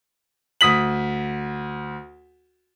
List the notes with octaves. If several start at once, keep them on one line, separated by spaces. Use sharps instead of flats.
D2 D#6 B6 F#7